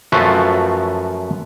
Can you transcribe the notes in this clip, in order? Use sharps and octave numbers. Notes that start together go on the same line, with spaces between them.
F#2 F3 A3 F4 F#4 B4